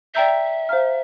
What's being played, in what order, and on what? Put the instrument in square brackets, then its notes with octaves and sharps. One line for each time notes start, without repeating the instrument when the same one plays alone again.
[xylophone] D5 G5 A#5 E6 G6 [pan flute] E5
[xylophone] C5 F5 A#5 F6